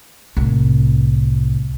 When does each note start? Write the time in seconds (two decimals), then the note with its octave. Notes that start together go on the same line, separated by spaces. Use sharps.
0.37 C2 A2